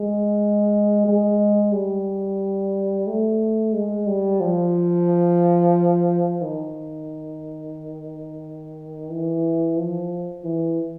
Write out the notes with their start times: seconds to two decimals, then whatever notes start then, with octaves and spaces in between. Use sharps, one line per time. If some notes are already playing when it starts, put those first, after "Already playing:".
Already playing: G#3
1.06 G#3
1.73 G3
3.07 A3
3.73 G#3
4.07 G3
4.41 F3
6.42 D#3
9.10 E3
9.77 F3
10.44 E3